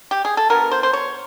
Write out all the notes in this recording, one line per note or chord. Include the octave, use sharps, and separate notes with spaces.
G4
G#4
A4
D3 F#3 B3 A#4
C5
C5
C#5